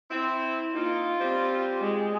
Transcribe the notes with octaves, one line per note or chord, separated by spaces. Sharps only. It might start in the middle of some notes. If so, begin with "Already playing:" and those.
C4 E4
A#3 D#4 F4
G3 C4
G#3